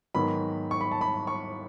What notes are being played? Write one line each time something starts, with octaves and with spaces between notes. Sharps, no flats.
G#2 D#3 F#3 B3 B5
C#6
B5
A5
B5
C#6